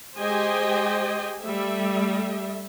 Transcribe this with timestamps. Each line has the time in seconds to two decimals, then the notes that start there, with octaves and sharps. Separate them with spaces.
0.17 G#3 G4 C5 D#5 G5 G#5
1.41 G3 A3 E5